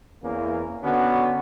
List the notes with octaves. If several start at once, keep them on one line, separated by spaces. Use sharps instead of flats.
E2 E3 A#3 C#4
D3 B3 C#4 F#4